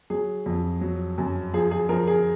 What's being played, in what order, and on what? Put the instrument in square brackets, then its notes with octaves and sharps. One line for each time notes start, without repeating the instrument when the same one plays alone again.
[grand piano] F#3 G#4
F2
F#3
F#2
F3 G#4
G#4
F3 A#4
G#4